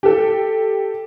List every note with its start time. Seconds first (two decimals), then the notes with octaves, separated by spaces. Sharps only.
0.03 G4 A4